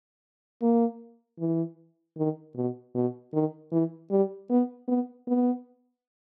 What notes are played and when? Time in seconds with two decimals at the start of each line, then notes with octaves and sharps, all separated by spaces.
0.62 A#3
1.39 E3
2.17 D#3
2.56 B2
2.95 B2
3.33 D#3
3.72 E3
4.11 G3
4.50 B3
4.88 B3
5.27 B3